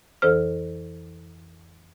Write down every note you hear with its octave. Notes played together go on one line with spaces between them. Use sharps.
F2 E3 A4 C5 F6